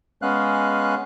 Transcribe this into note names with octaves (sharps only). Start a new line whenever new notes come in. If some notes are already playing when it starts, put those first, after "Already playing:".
G#3 B3 C#4 F5 F#6